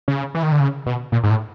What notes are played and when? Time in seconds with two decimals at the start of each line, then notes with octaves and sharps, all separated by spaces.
0.08 C#3
0.35 E3
0.43 D#3
0.52 D3
0.60 C#3
0.86 B2
1.12 A#2
1.23 G#2
1.30 A2